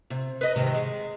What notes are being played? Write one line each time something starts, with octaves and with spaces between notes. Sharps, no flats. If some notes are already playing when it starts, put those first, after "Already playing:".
C3
B4 D#5
G#2 C3 D#3
G#3